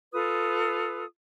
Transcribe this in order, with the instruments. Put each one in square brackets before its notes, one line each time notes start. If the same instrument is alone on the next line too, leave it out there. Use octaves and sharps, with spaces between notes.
[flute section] F4 A4 B4 D#6